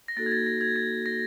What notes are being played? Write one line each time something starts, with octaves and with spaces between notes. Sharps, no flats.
A#6
A#3 D#4 F#4 A4 A6
G#6
A6
A#6
G#6
A6
A#6